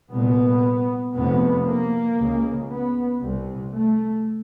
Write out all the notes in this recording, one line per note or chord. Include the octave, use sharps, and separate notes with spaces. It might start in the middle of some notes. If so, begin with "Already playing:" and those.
C2 A#2 B3
F1 F2 C3 B3
A#3
C#2 C#3
B3
C2 C3
A3